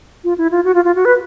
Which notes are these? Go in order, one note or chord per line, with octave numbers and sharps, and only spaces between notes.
F4
E4
F4
F#4
F4
F4
F#4
B4